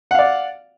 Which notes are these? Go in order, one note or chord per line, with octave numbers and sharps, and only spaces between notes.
D5 F5 F#5